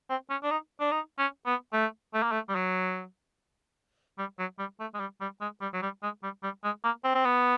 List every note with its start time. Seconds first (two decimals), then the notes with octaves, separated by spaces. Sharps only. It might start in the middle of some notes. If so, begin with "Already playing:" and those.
0.10 C4
0.30 C#4
0.43 D4
0.51 D#4
0.80 D4
0.91 D#4
1.18 C#4
1.46 B3
1.73 A3
2.14 A3
2.23 A#3
2.32 A3
2.49 G3
2.55 F#3
4.18 G3
4.39 F#3
4.59 G3
4.80 A3
4.94 G#3
5.00 G3
5.21 G3
5.41 G#3
5.61 G3
5.73 F#3
5.82 G3
6.03 G#3
6.23 G3
6.43 G3
6.64 G#3
6.84 A#3
7.04 C4
7.15 C4
7.25 B3